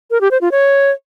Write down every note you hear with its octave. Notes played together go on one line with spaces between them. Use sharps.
A#4
G4
C5
F4
C#5